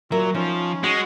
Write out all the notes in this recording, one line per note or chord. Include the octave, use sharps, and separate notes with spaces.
A#2 F#3 A#4 E5
F3 C#4 D#4
G#3 F#4